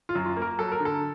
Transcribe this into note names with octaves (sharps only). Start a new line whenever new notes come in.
F4
F#2
F4
A#3
A#4
F#3 A4
A#4
D3
A4